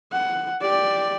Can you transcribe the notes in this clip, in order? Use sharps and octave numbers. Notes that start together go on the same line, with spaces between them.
F#5
G4 D5